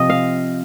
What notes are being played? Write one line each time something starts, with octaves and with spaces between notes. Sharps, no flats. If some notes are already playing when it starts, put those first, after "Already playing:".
Already playing: C3 F3 C4 D#5
F5